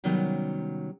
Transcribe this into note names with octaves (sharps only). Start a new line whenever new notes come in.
C3 D#3 F#3 G3 B3 C#4